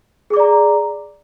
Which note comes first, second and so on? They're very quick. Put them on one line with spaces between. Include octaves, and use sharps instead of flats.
G#4 D6 D5 A#5